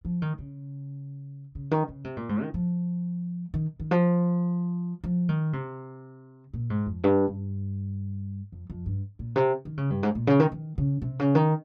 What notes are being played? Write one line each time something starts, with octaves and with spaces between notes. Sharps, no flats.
F3
D#3
C#3
C#3
D#3
C#3
C3
A#2
G#2
D#3
F3
D#3
D#3
F3
F3
D#3
C3
A#2
G#2
F2
G2
G2
F2
F2
G2
A#2
C3
D#3
C#3
G2
G#2
A#2
C#3
D#3
D#3
C#3
C3
C#3
D#3